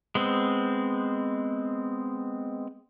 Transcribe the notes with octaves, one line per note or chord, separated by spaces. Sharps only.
G#3 B3 C4